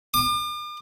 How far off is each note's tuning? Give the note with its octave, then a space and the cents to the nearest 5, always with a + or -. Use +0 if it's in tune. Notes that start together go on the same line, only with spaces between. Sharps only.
D6 +45